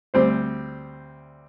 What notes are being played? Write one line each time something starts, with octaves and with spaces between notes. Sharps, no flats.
D2 G3 C4 C5